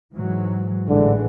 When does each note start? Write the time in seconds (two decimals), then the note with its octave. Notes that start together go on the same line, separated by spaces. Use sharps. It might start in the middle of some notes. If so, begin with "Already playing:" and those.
0.15 G#2 E3 F#3
0.89 A1 D3 E3 G#3